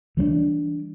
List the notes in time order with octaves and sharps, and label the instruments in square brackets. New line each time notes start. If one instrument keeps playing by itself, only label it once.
[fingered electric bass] E3 G3 C4 D4